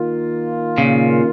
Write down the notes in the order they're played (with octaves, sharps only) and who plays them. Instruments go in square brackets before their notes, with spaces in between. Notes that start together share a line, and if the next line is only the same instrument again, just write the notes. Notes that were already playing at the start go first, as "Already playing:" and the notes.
Already playing: [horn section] D#3 A#3 F4
[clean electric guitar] A#2 C#3